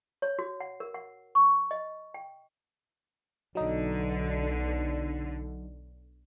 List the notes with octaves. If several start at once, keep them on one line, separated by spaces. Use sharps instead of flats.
C#5
F#4
F#5
A#4
F#5
C#6
D#5
G5
B1 D3 F#3 D#4